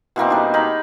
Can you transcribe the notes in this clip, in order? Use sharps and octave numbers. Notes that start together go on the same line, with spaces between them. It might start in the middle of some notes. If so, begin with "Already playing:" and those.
B2 E3 A#3 C4
G3 D4 D#4
D#4 G#4 A#4 B5